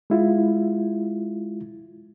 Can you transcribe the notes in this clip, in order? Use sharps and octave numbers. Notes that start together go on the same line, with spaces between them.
G#3 E4 F4